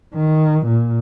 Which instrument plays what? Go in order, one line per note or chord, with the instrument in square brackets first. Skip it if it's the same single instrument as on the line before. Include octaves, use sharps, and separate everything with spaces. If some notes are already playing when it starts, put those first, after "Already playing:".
[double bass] D#3
A#2